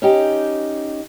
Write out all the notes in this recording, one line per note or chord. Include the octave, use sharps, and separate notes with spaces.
C#4 D#4 G4